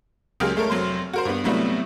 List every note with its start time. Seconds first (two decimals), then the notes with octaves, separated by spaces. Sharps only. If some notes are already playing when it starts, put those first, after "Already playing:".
0.40 C#2 F#3 A#3 G4 G#4 F6
0.56 G#3 A3 A4 A#4 C#5
0.70 F1 F#3 C5 C6
1.13 F#4 A#4 C5
1.25 G2 B3
1.44 A2 C3 F#3 G3 A3 B3